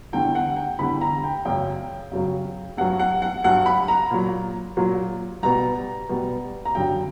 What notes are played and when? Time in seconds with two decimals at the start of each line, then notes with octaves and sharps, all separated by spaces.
0.13 E2 D3 G3 G5
0.35 F#5
0.56 G5
0.79 E2 D3 G3 B5
1.01 A#5
1.24 G5
1.45 F#2 C#3 F#3 G5
2.12 F#2 C#3 F#3
2.77 G2 F#3 F#5
2.99 F#5
3.22 F#5
3.44 G2 F#3 F#5
3.66 B5
3.88 A#5
4.11 A#2 F#3
4.77 A#2 F#3
5.42 B2 G3 A#5
6.09 B2 G3
6.65 A#5
6.75 F#2 D3 G3 G5